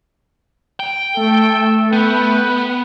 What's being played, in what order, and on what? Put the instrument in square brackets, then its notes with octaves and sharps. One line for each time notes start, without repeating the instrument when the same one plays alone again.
[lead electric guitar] G5
[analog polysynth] A3 [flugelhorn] A4
[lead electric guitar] B3 [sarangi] B4 [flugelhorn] G5